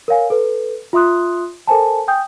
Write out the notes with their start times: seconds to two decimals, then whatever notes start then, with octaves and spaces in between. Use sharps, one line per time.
0.08 A#4 C#5 F5 G#5
0.30 A4 B4
0.93 F4 E5 C6 D#6 F#6
1.67 A4 A#4 C5 G#5 A5
2.08 G5 G#5 D#6 G6